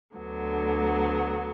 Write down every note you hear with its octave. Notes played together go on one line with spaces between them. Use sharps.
D2 D3 F#3 B3